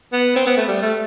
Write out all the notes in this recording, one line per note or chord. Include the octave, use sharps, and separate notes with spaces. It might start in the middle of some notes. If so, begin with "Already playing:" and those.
B3
C4
B3
A3
G3
A3